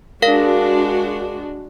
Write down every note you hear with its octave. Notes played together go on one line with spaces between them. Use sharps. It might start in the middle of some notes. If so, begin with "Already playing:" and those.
G#3 D4 F#4 A#4 F5 A#6